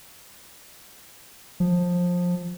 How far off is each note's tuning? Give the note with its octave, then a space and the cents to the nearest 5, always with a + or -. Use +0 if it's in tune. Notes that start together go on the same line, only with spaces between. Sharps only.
F3 +20